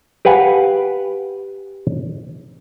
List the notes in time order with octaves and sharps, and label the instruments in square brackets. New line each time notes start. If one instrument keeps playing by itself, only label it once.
[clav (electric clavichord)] G4 B4 F5 F#5 G#5